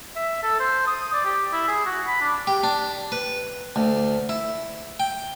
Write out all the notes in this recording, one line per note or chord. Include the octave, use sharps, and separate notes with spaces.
E5
A4
C5
D#6
D5
G4
E4
G#4
F#4
B5
D4
G4
D4
B4
D2
E4
G5